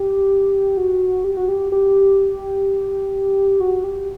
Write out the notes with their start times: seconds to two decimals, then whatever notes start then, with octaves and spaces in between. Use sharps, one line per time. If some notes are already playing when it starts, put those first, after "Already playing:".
Already playing: G4
0.77 F#4
1.24 G4
1.37 F#4
1.49 G4
1.72 G4
3.60 F#4
3.84 G4